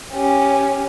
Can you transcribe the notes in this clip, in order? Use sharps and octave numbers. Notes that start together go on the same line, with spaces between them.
C#4 G4